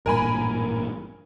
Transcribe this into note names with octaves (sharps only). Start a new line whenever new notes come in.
A1 G2 A#2 A#4 G#5 B5